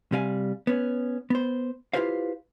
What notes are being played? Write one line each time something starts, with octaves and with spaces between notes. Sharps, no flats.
C3 G3 F5 G#5
B3 C#4
B3 C5
E4 F4 G4 B4 C5 F5